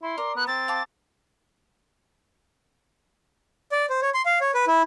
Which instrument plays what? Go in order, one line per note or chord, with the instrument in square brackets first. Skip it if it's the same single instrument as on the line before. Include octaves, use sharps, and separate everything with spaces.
[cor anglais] E4 [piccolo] C6
[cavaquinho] A#4 [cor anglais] D5
[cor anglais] B3 [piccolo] F#6
[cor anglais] C4 [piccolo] A6
[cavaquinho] F5 A5 D6
[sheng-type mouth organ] D5
C5
C#5
C6
F5
C#5
B4
E4